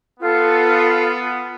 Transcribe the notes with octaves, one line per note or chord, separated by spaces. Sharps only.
B3 F4 A4